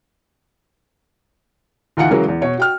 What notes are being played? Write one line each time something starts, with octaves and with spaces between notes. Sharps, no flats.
D2 E3 D#4 F4 F#5 C#7
C#3 E3 F#3 G#3 A#4
E2
B2 C#5
F#4 G5 F6